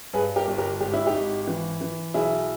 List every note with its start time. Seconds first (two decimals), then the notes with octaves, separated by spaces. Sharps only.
0.13 G2 G#4 B4
0.36 G4 A#4
0.47 G1
0.58 G4 A#4
0.80 G#1 G4
0.93 E4
1.06 D#4 G4
1.14 G#1
1.47 E3
1.81 E3
2.14 B1 E4 G#4